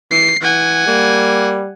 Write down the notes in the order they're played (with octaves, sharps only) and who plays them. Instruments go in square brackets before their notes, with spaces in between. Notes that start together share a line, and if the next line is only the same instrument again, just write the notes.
[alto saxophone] E3 [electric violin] C7
[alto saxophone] E3 [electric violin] F#5 G#5
[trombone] G3 [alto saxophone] A#3